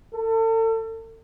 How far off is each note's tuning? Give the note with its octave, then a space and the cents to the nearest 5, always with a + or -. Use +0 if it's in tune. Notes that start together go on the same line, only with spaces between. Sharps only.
A4 +35